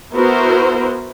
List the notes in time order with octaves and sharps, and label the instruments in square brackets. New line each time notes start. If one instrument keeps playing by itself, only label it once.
[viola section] B3 E4 F#4 A#4 C5